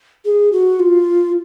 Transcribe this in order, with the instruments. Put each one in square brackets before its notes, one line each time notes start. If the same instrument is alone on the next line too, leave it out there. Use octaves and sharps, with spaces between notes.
[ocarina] G#4
F#4
F4